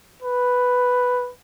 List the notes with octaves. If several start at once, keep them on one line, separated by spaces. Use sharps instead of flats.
B4